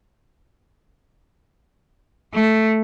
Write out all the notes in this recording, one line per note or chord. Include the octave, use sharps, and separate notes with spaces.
A3